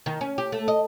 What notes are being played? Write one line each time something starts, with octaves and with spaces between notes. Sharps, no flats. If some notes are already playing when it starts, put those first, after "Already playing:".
D#3
C#4
G4
A3
D#5